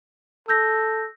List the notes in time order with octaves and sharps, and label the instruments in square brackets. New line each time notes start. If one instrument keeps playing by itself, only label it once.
[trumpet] A4 [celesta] E6 G6 A#6